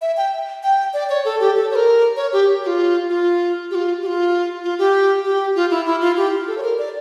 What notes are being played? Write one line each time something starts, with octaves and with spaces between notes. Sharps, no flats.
E5
G5
G5
D5
C#5
A4
G4
A4
C#5
A#4
C#5
G4
G4
F4
F4
G4
F4
G4
F4
F4
G4
G4
F4
E4
E4
F4
G4
A4
C#5
A#4
D5